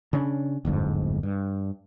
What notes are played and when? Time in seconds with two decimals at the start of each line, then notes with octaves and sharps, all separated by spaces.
0.13 C#3 C#4 D4
0.65 D1 G1 F2 G#2
1.23 G2